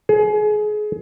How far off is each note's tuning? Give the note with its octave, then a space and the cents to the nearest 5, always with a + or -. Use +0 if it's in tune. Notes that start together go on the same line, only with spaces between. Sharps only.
G#4 +30